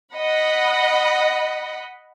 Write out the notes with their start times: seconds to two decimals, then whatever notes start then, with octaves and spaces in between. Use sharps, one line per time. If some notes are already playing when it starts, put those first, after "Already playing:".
0.15 D#5 F#5 B5